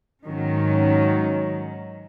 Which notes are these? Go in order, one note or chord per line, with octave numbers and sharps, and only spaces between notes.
G#2 D#3 F#3 C#4